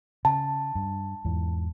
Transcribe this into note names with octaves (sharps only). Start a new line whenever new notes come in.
C#3 A5
G2
E2 G#2 E3